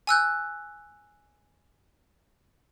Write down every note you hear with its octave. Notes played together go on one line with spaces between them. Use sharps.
G#5 E6 F#6 G6